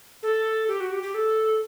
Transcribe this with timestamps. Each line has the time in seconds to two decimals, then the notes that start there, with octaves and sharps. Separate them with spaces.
0.23 A4
0.68 G4
0.80 F#4
0.91 G4
1.03 G4
1.14 A4